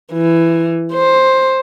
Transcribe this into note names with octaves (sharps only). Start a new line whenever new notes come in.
E3
C5